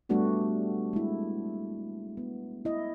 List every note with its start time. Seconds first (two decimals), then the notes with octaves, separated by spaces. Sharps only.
0.09 G3 A3 B3 D4 F#4 G4
0.93 G#3 E4
2.17 B3
2.65 E4 D#5